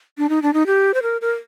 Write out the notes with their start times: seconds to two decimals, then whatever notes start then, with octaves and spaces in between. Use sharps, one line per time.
0.18 D4
0.29 D#4
0.42 D4
0.53 D#4
0.66 G4
0.94 C5
1.02 A#4
1.21 A#4